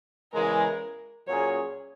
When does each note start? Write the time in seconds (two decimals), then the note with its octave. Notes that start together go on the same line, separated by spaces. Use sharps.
0.33 E2 C#3 E3 G#3 A#4
1.27 A#2 F#3 C#4 G#4 C#5